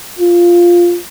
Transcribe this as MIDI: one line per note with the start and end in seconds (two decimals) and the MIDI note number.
0.19 0.98 65